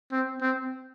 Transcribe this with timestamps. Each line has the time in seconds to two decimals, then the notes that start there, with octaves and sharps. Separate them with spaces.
0.12 C4
0.41 C4